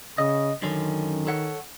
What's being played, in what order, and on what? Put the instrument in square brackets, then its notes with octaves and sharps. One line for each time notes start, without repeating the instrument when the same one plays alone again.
[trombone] C#3 [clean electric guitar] D#5
[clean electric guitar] F#2 D3 C#4 [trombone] D#3
[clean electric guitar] A4 C#5 F#5